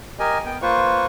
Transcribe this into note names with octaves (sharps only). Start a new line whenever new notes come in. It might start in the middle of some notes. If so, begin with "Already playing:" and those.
G4 A#4 D#5 G#5
B3 G5
A#3 F4 B4 C5 C#6